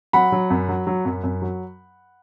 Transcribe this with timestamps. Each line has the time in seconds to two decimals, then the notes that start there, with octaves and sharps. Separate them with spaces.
0.13 F#3 F#5 B5
0.32 F#3
0.50 F#2
0.69 F#3
0.87 F#3
1.05 F#2
1.24 F#2
1.42 F#3